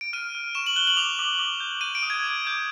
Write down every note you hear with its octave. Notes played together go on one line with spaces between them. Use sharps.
D7
F6 D#7
F6
C#6 E7
F#7
F#6 G7
F#7
D6 F7
D6
D6
G6
G6 D#7
D7
D#6
G#6
D6
D6 G6